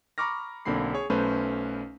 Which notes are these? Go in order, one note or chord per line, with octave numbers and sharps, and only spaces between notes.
A#5 B5 C#6 D6 F6 A#6
B1 D3 A#3 C4 B5 C7
G#4 C#5
B1 A3 C#4 B4 C5